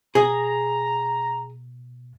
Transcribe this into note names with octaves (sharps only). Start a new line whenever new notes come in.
B2 G#4 D#5 A#5